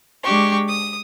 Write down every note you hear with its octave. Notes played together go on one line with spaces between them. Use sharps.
G#3 D4 G4 C#6
D#6